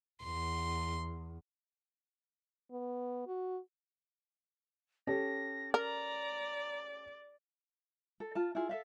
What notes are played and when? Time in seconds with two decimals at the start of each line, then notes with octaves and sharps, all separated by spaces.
0.24 E2 C6
2.72 B3
3.27 F#4
5.07 C#4 G4 A4 A#6
5.74 A#4 D5 A#5
8.20 A4
8.35 F4 A5
8.55 E4 F4 G#4
8.69 A4 E5 F5